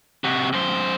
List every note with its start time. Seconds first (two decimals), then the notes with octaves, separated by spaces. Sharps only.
0.24 C3 F#4
0.53 F#2 C5